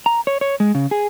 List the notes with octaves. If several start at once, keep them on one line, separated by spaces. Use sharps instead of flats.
A#5
C#5
C#5
G#3
C#3
G#4